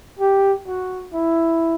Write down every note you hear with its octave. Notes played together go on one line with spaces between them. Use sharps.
G4
F#4
E4